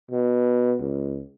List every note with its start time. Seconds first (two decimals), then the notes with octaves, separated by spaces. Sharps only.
0.11 B2
0.80 C#2